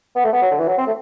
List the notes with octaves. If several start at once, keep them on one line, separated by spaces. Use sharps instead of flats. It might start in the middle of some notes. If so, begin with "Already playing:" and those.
B3
A3
B3
F#3
D3
E3
F#3
C4
A3